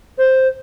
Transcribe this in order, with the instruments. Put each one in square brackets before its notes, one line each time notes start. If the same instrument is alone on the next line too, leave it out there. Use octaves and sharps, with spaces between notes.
[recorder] C5